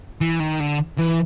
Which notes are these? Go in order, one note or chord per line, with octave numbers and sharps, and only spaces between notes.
E3
D#3
D3
E3